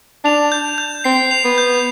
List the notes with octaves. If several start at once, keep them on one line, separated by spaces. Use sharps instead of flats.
D4 F7
G6
G6
C4 C7
F7
B3
G6